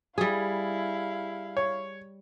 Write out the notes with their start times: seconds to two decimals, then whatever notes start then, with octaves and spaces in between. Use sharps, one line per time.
0.18 G3 E4 G#4 F5
1.57 C#5